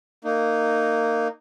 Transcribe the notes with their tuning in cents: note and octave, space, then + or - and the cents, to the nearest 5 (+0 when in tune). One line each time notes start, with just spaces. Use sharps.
A#3 -15 D#4 -15